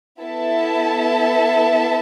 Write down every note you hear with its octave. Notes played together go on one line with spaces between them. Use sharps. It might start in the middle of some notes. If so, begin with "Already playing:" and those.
B3 E4 A4 E5 A5